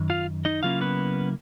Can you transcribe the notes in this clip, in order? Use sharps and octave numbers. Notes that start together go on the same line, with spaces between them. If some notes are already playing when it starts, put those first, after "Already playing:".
Already playing: F#2 D#3
F4 F5
D#4 D#5
C#3 F#3 A#3 C#4 E4 F4 F5
B3 B4